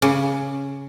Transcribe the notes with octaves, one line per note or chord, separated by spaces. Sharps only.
C#3